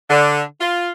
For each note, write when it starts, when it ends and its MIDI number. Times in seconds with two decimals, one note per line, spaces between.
0.10 0.43 50
0.61 0.89 65